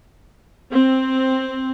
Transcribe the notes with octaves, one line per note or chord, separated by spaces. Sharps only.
C4